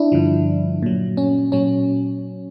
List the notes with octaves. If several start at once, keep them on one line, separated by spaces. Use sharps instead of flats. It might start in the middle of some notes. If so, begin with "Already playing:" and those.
Already playing: D4 E4
G2 D3 F3
A#2 F#3
C#4
A#2 F#3 C#4